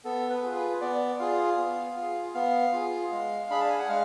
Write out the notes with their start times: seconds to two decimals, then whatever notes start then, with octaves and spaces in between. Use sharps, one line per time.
0.05 B3 A4
0.30 B4
0.42 F4 G#4
0.55 B4
0.81 B3 D5
1.20 F4 G#4 F5
1.58 B3
1.96 F4
2.01 G#4
2.34 B3 F5
2.73 F4 G#4
3.11 G#3
3.50 D4 G#4 B5
3.60 A5
3.69 G#5
3.79 F#5
3.88 G#3 F5